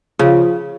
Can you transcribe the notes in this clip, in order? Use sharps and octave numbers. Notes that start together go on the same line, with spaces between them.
C#3 F3